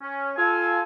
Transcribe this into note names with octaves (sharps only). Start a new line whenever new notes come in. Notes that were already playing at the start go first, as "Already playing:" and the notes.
C#4
F4 A4 G#5